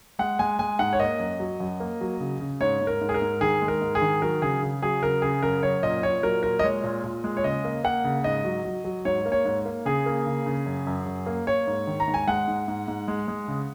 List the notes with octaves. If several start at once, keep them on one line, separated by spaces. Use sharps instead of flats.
G#3 F#5
G#3 G#5
G#3 G#5
G#2 F#5
C#5
A#3 D#5
F#2
F#3
F#2
A#3
F#3
C#3
C#3
G#2 C#5
G#2
A#4
G#2
G#4
A#4
G#2
D#3 G#4
G#3
A#4
G#2
G#4
D#3
F#3 A#4
C#3 G#4
C#3
F#3 G#4
C#3 A#4
C#3 G#4
F#2 A#4
F#2 C#5
A#2 D#5
A#2 C#5
F#3 A#4
A#2 A#4
D#5
G#3 C#5
A#2
A#2
G#3
C#5
C#3 D#5
A#3
A#3 F#5
C#3
G#2 D#5
F#3
F#3
F#3
G#2 C#5
A#3
C#5
G#2
A#3
C#3 G#4
A#3
C#3
C#3
F#2
F#2
F#2
A#3
A#3 C#5
G#2
D#3
A#5
G#2
G#5
G#3 F#5
G#2
G#2
G#2
G#3
G#3
C#3